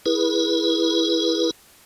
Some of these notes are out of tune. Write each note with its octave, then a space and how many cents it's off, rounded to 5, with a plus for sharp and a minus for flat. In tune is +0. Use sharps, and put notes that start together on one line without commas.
E4 +0 G#4 +0 B4 -30